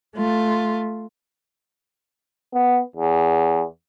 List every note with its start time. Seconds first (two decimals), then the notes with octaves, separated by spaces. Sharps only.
0.15 A3 F4
2.54 B3
2.96 E2